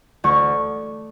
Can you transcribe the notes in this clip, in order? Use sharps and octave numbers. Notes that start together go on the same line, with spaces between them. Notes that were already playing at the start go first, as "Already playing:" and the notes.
D2 C#6